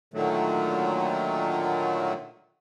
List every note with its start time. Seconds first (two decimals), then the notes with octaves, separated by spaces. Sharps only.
0.14 A#2 D3 D#3 F#3 A3